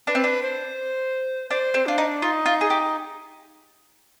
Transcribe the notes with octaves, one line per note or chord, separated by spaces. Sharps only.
D4 B4
C4
D4
C5
D4 C5
C4
D4 F4
D#4
D#4 F4
F4
G#4
G4